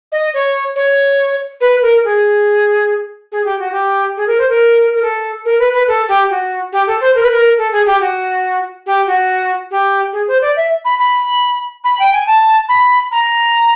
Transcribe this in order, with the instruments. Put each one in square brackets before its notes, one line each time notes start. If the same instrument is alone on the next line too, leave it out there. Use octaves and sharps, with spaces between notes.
[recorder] D#5
C#5
C#5
B4
A#4
G#4
G#4
G4
F#4
G4
G#4
A#4
C5
A#4
A#4
A4
A#4
B4
B4
A4
G4
F#4
G4
A4
C5
A#4
B4
A#4
A4
G#4
G4
F#4
G4
F#4
G4
G#4
C5
D5
E5
B5
B5
B5
G5
G#5
A5
B5
A#5